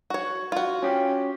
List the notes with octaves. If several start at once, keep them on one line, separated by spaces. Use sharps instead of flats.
F#4 C#5
F4 F#4
C#4 G4